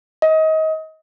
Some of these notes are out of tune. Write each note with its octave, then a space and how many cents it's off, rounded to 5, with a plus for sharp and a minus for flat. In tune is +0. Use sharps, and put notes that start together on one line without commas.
D#5 +30